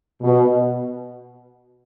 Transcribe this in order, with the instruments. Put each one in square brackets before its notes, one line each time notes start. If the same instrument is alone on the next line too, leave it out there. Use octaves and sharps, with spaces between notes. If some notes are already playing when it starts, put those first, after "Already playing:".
[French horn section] B2